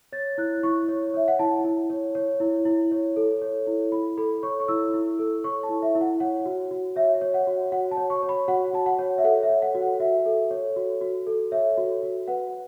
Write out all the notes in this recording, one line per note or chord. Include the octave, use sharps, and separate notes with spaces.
C#5 A6
E4 F#6
E4 C#6
C#5
C#5 E5
F#5
E4 A5
E4
C#5
C#5
E4
E4
C#5
A4
C#5
E4
E4 B5
A4 B5
C#5 C#6
C#6
E4 E6
E4
A4
C#5 C#6
A5
E4
E5
E4
F#5
C#5 F#5
F#4
F#4
C#5 E5
C#5
F#5
F#4
F#4 F#5
A5
C#5
C#6
C#5
B5
F#4 F#5
F#4 A5
F#5
C#5
E5
A4 F#5
E5
C#5
F#5
F#4
F#5
F#4 E5
A4
C#5
F#4
F#4
A4
C#5 E5
F#4
F#4
B4 F#5